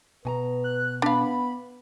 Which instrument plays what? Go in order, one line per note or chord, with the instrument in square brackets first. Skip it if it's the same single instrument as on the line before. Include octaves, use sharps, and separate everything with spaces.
[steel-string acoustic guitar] B2 G#5 A#5 [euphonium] B4
[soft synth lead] F#6
[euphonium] B3 [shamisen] D4 F5 [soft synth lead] B5